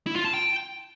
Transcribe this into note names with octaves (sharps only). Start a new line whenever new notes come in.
E4
F4
A5
G5